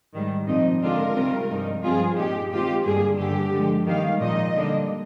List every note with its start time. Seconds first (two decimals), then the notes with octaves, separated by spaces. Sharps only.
0.14 G#2 D#3 G3
0.47 A#2 F3 C4 D#4 D#5
0.82 D3 G#3 D4 F4 A#4
1.15 C3 D#3 G3 C4 F4
1.49 G2 F3 G#3 D#4
1.83 G2 F3 C4 F4 G#4
2.17 A#2 G#3 D#4 G4
2.51 D#3 G#3 C4 F4 G4
2.85 G2 D3 G3 A#3 G#4
3.18 G2 D3 G3 G4
3.53 D3 F3 G#3
3.86 D#3 G3 A#3 F5
4.20 A#2 F3 G#3 D#4 D#5
4.54 D3 G3 A#3 D4